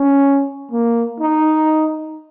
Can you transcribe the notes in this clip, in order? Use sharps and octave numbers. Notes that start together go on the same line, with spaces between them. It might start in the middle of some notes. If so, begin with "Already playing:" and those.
Already playing: C#4
A#3
D#4